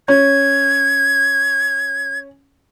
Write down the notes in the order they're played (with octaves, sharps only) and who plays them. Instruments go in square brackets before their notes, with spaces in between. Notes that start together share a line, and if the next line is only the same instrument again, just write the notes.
[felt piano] C#4 [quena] G#6